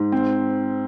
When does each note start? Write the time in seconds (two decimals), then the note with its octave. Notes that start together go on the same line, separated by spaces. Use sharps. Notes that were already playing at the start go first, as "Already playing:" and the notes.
Already playing: G#2
0.12 C4